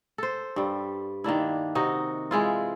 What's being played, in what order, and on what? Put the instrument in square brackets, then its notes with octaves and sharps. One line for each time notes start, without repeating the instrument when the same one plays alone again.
[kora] A4 C5
G2 G3
D#3 A#3 D4 E4
C3 D#4 F#4
E3 G#3 E4 F4